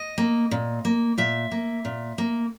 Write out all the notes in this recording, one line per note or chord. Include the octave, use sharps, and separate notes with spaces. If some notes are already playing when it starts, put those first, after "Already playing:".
Already playing: D#5
A#3
A#2
A#3
A#2 E5
A#3
A#2
A#3